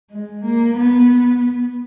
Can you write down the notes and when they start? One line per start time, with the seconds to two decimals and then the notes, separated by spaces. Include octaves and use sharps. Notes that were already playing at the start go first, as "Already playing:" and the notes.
0.11 G#3
0.44 A#3
0.77 B3